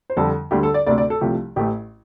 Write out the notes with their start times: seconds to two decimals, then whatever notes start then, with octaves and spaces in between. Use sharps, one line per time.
0.10 C5
0.17 F2 D3 G3 A4
0.51 D2 D3 G3 G4
0.63 A4
0.74 D5
0.87 D2 C3 A3 D5
0.98 D5
1.10 A4
1.21 C2 C3 F3 A3 G4
1.56 A1 A2 A3 G4